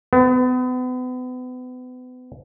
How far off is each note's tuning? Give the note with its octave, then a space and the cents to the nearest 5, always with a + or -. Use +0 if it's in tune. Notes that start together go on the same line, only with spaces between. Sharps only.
B3 +35